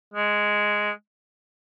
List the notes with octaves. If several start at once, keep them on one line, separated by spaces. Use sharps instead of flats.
G#3